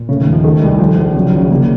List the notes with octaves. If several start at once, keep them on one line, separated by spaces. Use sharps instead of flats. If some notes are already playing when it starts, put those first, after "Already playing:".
Already playing: A#2
C#3 A3
D#3
D#2
F3
D#3 A3
C2
F3
A#1
C#3 F#3
D#3
A#1 C#3
C3 A#3